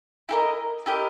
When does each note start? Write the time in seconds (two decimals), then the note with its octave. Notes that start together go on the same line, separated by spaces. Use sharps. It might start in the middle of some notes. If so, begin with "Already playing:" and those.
0.29 E4 G4 A#4 D#5
0.86 E4 G4 A#4 D#5